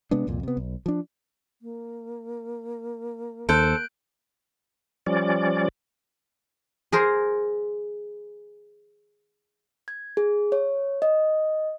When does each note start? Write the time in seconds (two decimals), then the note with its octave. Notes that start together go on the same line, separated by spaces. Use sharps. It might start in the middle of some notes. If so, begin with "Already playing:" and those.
0.11 C3 G#3 B3 D4
0.27 C2 F2 A#2
0.43 C3 B3
0.57 B1
0.86 F3 D4
1.62 A#3
3.49 D#2 A4 C5 F#6 G6 D7
5.06 F3 G3 C#4 D5
6.92 G#4 A#4 C5
9.88 G#6
10.17 G#4
10.52 C#5
11.02 D#5